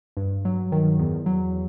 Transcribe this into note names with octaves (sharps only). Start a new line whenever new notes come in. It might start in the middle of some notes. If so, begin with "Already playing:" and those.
G2
F#3
D#3
E2
F#3